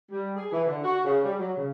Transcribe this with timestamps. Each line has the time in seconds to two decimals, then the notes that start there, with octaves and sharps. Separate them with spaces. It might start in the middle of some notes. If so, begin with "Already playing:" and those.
0.11 G3
0.37 G#4
0.52 E3
0.66 D3
0.84 F#4
1.04 C#3
1.23 G3
1.38 F#3
1.57 C#3